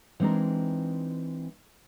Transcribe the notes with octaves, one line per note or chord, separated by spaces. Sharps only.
E3 G#3 C4 D4 D#4 A#4